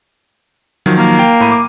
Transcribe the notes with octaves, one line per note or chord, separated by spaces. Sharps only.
D#3 F3 F#3
A#3
F5 G5
A2 B5 D#7
D6